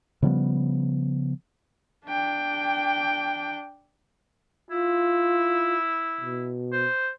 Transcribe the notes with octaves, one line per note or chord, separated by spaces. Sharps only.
C#3 F3 G3 B3
D4 G5
E4 F4
B2
C5